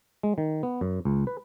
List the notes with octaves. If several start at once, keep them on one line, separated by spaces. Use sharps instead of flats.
G#3
D#3
B3
F#2
C#2
B4